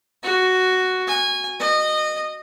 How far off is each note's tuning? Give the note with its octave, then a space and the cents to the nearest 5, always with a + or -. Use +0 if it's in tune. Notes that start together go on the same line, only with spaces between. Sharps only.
F#4 +5
G#5 -20
D#5 -20